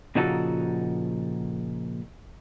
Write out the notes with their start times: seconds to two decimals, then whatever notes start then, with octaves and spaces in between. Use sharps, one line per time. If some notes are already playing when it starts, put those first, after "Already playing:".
0.15 A#2 C#3 F3 D#4 F#4 A4